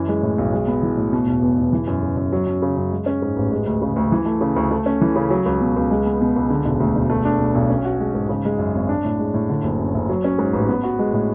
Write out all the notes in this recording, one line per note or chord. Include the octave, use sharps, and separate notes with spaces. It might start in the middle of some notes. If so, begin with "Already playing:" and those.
Already playing: F#2 E3
G#3
A2
B1
G#3
B3
E3
A2
B2
E1
E2
E1
E3
F#2
C#3
F#2
F#3
F#2
C#3
F#2
G#3
C#4
G#2
A1
G#3
D2
C#3
D2
E3
A3
C#3
D2
A3
C#4
E3
C#3
F#3
C#2
B2
C#2
G#3
B3
B2
C#2
D3
E1
D2
E1
A3
D4
B2
B1
C#4
F#4
G#3
G#2
C#3
G#3
F#2
G#1
D4
A2
G#3
A2
D3
F#1
F#2
F#1
F#3
C#4
G#2
A1
B3
F#4
G#3
A2